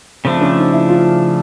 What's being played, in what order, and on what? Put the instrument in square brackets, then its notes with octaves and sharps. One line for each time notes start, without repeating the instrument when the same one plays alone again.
[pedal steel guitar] C#3 F3 A3 D4 [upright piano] C4
[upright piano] C#4
D#4
E4
F4